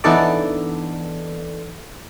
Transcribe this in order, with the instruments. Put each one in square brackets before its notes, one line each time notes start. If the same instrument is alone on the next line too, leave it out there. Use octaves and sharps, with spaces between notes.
[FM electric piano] E3 B3 D4 D#4 A4 D5